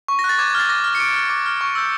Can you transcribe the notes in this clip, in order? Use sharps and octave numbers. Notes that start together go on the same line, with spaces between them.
C#6
A#6
F#6
A6
D6 G#6
G#6
F6 A6
D6 A#6
F6
C#7
D6 D7
F6
D6
F6
C#6
E6 G6